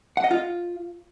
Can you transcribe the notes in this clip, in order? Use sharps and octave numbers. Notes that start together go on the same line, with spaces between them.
F#5
D#5
F4